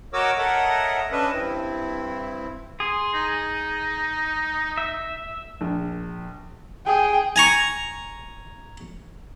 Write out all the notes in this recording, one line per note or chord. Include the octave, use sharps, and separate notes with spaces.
F#4 A#4 C#5 D#5 D6 E6
A4 A#4 C#5 D#5 E5 F#5
C#4 D4 B4 D#5 E5
G2 C4 E4
G#4 C6
D#4
E5
A#1
G#4 G5
G#5 A#5 C#6